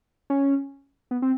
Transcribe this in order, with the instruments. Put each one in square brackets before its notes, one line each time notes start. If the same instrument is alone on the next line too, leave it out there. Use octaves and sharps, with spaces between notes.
[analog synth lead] C#4
B3
C4